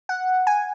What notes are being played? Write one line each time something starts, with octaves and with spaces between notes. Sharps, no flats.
F#5
G#5